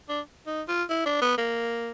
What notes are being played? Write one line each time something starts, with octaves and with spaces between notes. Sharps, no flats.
D4
D#4
F4
E4
D4
B3
A#3